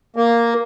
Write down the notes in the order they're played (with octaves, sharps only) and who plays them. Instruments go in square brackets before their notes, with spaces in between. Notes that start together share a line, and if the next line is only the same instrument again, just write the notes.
[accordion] A#3